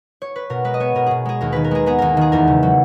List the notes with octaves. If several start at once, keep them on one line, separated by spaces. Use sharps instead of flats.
C#5
B4
B2 A#4
G#3 B4
D#5
B3 C#5
B2 A#4
B2 G#4
G#3 G#4
D#2 A#4
D#3 B4
A#4
G#3 G#4
B3 G#4
D#2 A#4
D#3 G#4
E2 A#4
C#3
F#3